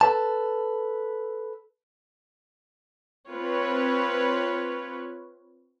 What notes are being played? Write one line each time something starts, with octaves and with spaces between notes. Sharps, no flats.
A4 B4 A5
C4 F4 B4 C#5